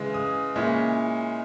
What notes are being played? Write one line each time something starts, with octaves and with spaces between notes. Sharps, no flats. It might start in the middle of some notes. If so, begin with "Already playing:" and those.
Already playing: C#3 E3 G#3
D#6
A#2 G#3 C#4 E4